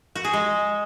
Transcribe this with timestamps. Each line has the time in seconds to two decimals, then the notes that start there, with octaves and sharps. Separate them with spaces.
0.15 F#4
0.24 G#4
0.33 G#3